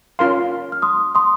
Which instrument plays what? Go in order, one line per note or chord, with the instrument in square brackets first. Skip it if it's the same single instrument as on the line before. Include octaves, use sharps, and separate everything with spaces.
[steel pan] C#4 F4 A#4 F5 C6
[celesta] F6
C6 D#6
C6 D#6